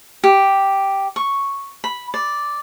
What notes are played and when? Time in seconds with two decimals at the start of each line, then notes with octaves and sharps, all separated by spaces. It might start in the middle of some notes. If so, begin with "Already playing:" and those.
0.24 G4
1.16 C#6
1.84 B5
2.14 D5